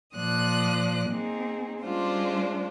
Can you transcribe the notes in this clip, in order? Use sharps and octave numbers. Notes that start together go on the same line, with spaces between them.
A#2 F3 D5 D#6 F#6
A#3 C4 D#4 G#4
G3 G#3 C#4 D4 F4 C5